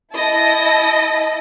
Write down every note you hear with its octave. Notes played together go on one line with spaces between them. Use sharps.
E4 D#5 A5 A#6